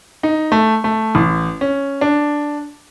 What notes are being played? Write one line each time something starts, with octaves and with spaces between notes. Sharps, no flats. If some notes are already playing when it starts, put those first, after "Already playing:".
D#4
A3
A3
A1
C#4
D4